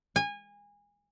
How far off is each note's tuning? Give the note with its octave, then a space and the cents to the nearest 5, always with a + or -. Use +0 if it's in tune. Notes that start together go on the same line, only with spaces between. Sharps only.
G#5 -25